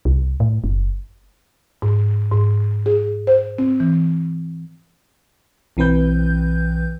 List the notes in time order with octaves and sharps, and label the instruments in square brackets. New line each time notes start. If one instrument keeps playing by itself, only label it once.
[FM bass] C2
A2
F#1
[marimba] G#2
G#2
G#4
C5
C4
E3
[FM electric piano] B1 E3 C4 B4 G6